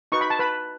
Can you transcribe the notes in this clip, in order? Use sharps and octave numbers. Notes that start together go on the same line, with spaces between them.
D#4 F#4 B4 C#6
B5
A5
B4 B5